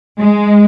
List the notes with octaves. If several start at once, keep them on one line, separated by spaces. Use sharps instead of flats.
G#3